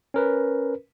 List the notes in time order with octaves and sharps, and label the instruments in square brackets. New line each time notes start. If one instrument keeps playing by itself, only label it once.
[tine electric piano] C#4 A#4 B4